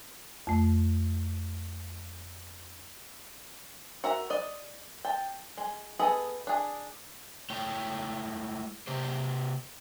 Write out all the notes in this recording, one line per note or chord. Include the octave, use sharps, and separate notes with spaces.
F2 A3
F#4 A#4 E5 A#5
D5 D#5
G5 A5
G#3
B3 G#4 A4 D#5
D4 G#4
G#3 A3 E4 C#5 G5
C3 A#3 G4 C5